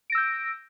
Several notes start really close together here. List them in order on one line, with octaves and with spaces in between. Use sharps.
D7 A#6 E6 G6